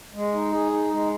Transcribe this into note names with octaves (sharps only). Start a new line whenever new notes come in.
G#3
D#4
G#4
D#4
G#3